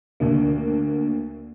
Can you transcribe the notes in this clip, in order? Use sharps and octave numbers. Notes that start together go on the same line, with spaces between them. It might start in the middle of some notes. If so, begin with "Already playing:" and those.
D2 D3 A#3